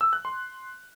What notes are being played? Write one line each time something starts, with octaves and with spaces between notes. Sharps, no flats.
E6
F#6
C6